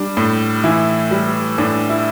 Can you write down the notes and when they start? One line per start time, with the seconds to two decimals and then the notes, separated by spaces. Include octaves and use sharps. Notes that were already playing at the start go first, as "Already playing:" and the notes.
Already playing: G3 D4
0.17 A2
0.64 E3 E4
1.11 G3
1.58 A2 D4
1.89 E4